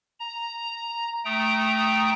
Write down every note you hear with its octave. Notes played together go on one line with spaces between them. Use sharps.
A#5
A3 G5 A#5 D#6